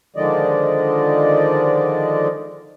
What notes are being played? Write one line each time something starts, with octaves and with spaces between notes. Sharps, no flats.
D3 D#3 F3 G#3 D5 D#5